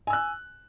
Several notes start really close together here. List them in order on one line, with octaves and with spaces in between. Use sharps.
G#5 E6 F#6